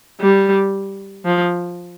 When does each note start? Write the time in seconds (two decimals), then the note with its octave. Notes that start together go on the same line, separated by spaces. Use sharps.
0.21 G3
1.25 F3